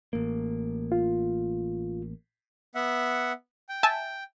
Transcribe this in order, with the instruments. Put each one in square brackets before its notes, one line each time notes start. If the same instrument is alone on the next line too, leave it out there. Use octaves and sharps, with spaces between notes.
[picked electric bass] A1 A#3
[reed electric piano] F4
[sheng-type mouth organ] B3 E5 F#5
G5
[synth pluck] E5 G#5 A5